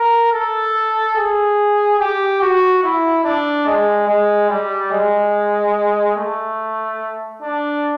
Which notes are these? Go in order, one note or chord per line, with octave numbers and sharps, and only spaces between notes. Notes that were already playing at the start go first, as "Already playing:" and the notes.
Already playing: A#4
A4
G#4
G4
F#4
E4
D4
G#3
G#3
G3
G#3
A3
D4